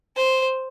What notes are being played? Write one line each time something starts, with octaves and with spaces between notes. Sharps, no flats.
C5